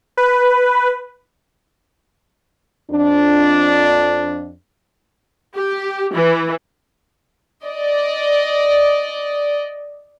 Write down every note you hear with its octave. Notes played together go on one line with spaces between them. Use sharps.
B4
F2 D4
G4
E3
D5 D#5